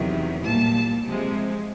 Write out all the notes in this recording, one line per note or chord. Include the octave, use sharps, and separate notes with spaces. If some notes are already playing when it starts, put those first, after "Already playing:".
Already playing: E2 C3 D#3 F#3
A#2 G3 A#3 A5
C3 F3 G#3